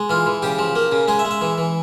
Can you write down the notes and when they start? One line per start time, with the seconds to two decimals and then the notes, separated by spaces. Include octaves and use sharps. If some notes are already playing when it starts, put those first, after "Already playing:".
Already playing: G#3
0.09 E3 F4
0.26 E3
0.42 C#3 G4
0.59 F3
0.76 A#3
0.92 C#3
1.08 G#3 G#4
1.19 E5
1.25 G#3
1.31 E5
1.41 E3
1.58 E3